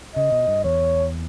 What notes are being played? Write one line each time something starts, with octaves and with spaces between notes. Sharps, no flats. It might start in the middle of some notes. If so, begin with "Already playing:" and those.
C#3 D#5
B2
G2
E2 C#5